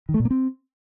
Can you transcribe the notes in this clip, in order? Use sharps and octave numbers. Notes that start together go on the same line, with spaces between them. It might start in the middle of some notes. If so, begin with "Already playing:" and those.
D#3
A3
A#2
A#3
C4